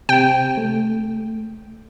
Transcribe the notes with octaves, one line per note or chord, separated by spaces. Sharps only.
C3 G5
A3